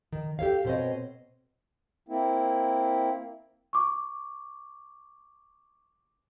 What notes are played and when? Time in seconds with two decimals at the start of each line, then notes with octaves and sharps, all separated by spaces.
0.12 D#3
0.39 G4 A4 C#5 F5
0.65 B2 C4 C5 C#5 D#5
2.09 A#3 C4 E4
3.73 C#6 D6